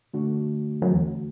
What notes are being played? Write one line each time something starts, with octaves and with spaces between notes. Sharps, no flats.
D3 A3 D4 F#4
F#2
E2